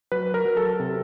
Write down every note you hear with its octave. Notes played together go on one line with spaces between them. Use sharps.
F#3 B4
A#4
F#3
A4
C3